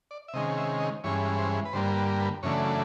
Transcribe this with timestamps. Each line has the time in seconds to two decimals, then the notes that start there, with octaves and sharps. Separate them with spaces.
0.11 D5
0.28 E5
0.33 C3 D#3 G#3 C#4 D#5
0.58 E5
0.80 D#5
1.04 G2 E3 G#3 C#4 C#5
1.38 C5
1.65 B4
1.73 G2 D3 G3 A#3 C5
1.96 B4
2.20 B4
2.43 F#2 C#3 E3 A3 D4 C#5